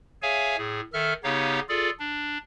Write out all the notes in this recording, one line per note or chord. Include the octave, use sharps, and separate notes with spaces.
G#4 C#5 E5 F5 G#5
A2 G#4
D#3 A4 E5 F6
C#3 B3 D#4 G4 C#5 F5
F4 G#4 A4 D5
D4